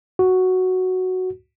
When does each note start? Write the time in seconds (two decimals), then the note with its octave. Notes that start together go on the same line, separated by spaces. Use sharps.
0.19 F#4